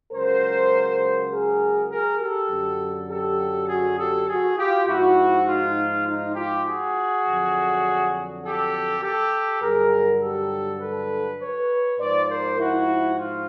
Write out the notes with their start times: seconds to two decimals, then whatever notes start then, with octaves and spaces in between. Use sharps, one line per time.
0.12 C#2 C#3 F#3 A#4 C5
1.30 G#4 A#4
1.90 G#4 A#4
2.20 G4 A4
2.50 F#2 D3 F#3
3.09 G4 A4
3.68 F#4 G#4
3.97 G4 A4
4.28 F#4 G#4
4.57 F4 G4
4.87 G#2 F3 E4 F#4
5.47 D#4 F4
6.05 D#4 F4
6.35 F4 G4
6.66 F#4 G#4
7.25 F2 D3 F#3
8.44 G4 A4
9.02 G4 A4
9.61 G2 D3 F#3 G#4 A#4
10.21 G4 A4
10.80 A4 B4
11.40 B4 C#5
11.99 G#2 F3 C5 D5
12.29 A#4 C5
12.58 E4 F#4
13.18 F4